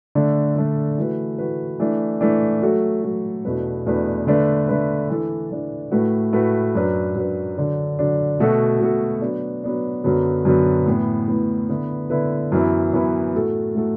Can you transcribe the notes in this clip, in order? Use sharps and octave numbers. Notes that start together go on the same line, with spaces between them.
D3 A3 D4
D3 A3 D4
E3 A3 F#4 B4
E3 A3 F#4 B4
E3 A3 D4
E3 A3 D4
F#3 A3 F#4 A4
F#3 A3 F#4 A4
E2 B2 A3 D4 B4
E2 B2 A3 D4 B4
D3 A3 D4 B4
D3 A3 D4 B4
E3 D4 A4
E3 D4 A4
A2 A3 F#4 B4
A2 A3 F#4 B4
F#2 F#3 D4 B4
F#2 F#3 D4 B4
D3 F#3 D4
D3 F#3 D4
B2 A3 F#4 A4
B2 A3 F#4 A4
F#3 B3 D4
F#3 B3 D4
F#2 D3 F#3 B3
F#2 D3 F#3 B3
A2 E3 B3
A2 E3 B3
D3 B3 E4 B4
D3 B3 E4 B4
F#2 E3 B3 E4
F#2 E3 B3 E4
A2 A3 F#4 A4
A2 A3 F#4 A4